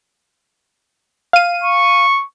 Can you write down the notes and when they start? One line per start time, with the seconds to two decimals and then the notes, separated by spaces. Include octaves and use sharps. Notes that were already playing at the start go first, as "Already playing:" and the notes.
1.33 F5 D#7
1.64 C#6